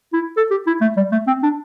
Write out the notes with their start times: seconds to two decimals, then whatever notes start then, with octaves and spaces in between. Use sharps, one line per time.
0.13 E4
0.37 A4
0.51 G4
0.67 E4
0.81 A3
0.97 G3
1.12 A3
1.27 C4
1.43 D4